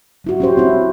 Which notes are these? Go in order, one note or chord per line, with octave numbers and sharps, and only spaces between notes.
F#3 E4 F#4
C#4 G4 C5
C4 E4